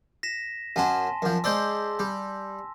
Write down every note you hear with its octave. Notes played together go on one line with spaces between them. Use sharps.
A#6 B6 E7
F#2 F#3 C#4 G#5 A5 C6
F#2 F3
G#3 C5 D5 C6 E6
G3